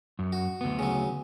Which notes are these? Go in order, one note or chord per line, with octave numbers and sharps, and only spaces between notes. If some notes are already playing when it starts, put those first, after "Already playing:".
F#2
F#4
D2 B3
C#3 F#3